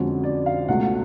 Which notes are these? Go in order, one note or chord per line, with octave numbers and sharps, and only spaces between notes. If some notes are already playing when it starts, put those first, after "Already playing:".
Already playing: F2 D3 G#3 C#4 F#4
D5
F5
C#2 B2 A3 F#5